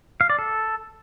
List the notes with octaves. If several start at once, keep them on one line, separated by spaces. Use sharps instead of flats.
F5
D5
A4